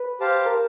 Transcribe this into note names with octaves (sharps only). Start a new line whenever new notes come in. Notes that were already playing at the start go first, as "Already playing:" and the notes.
Already playing: B4
G4 C5 F5 A5
A#4